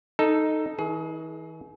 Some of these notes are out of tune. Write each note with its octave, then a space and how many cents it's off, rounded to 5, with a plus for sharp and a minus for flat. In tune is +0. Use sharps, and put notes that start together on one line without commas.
D#4 +0 A4 +0
E3 -45 G#4 +30